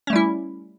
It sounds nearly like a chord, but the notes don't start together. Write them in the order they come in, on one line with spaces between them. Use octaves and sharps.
C#4 A3 G3 E4